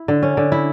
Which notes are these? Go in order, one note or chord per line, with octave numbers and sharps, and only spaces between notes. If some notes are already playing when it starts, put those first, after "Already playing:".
Already playing: E4
D3
C#4
D3
E4